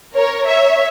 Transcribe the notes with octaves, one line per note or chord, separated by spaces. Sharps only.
A#4 C#5
C#5 E5